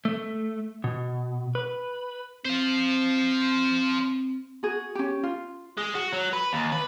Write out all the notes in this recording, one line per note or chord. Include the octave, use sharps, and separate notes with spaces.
A3
B2
B4
C4 C5 F5
F#4 G#4
C#4 G4
F4
G#3
F#4
F#3
B4
D#2
B4